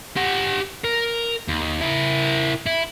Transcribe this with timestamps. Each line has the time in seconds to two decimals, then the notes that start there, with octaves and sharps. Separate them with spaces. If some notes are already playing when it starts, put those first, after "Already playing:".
0.17 G4 F#5
0.84 A#4
1.48 D#2
1.81 E4 A#4
2.66 E4